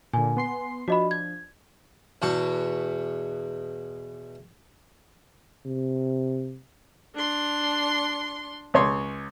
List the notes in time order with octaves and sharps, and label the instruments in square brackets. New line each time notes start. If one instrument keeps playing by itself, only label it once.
[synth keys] A#2 D3 [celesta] G#5
[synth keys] B3 C6 C7
[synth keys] F3 D4 [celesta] F#4 D#5 B5
[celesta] G#6
[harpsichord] E2 B2 A5 C#6
[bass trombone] C3
[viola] D4 C6
[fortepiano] C#2 C#5 C6